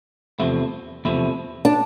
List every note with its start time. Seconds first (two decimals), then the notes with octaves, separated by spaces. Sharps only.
0.40 E2 C3 F3 A3 E4
1.05 E2 C3 F3 A3 E4
1.65 D4